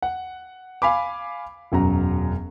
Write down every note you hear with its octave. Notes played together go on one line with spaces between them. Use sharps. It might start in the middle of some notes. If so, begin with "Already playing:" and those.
F#5
F5 G#5 B5 D6
E1 F#2 F#3 A#5